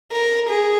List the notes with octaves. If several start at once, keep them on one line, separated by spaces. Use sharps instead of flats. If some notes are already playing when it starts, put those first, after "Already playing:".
A#4
G#4